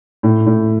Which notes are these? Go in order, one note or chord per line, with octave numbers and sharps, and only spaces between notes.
A2
A2